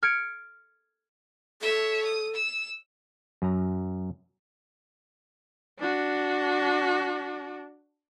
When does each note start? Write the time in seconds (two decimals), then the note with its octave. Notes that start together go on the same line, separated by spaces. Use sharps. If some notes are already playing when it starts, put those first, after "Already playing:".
0.03 F6 G#6 C#7 D7
1.62 A4 C#5 E5
2.05 D#6
2.34 E6
3.42 F#2 A#5
5.80 D4 F#4